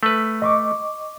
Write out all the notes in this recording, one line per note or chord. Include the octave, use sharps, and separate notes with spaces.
A3 B4
D#5 C#6 D6